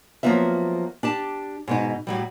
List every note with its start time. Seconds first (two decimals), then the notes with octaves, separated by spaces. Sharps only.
0.23 F3 F#3 A#3 B3 F4 E5
1.03 D4 G4 A5
1.67 G#2 B2 D#4
2.07 A2 F#3 G3